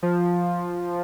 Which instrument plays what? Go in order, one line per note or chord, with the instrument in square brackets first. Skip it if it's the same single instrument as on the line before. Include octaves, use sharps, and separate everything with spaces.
[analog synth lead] F3